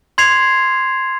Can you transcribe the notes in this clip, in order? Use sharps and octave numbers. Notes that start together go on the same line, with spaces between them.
C6 G#6 C7 F7